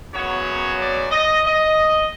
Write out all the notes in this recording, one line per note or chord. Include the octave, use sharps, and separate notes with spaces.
F#2 C#3 F#3 B3 C#5
D5
D#5
D#5